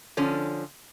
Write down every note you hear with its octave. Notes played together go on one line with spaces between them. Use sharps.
D3 F3 C#4